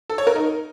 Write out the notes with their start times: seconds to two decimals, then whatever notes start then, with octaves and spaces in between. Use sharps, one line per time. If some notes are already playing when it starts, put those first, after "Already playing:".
0.10 A4
0.18 C#5
0.27 A#4
0.36 D#4